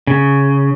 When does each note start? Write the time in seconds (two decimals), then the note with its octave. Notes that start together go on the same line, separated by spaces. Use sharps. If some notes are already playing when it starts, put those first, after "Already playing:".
0.07 C#3